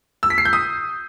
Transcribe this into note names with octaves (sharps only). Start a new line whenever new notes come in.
E6
B6
C7
G6
D#6